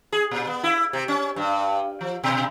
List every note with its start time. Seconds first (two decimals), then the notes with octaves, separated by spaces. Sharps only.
0.12 G#4
0.31 A#2
0.47 B3
0.63 E4
0.93 C3
1.08 C#4
1.36 G2
2.01 F3
2.23 B2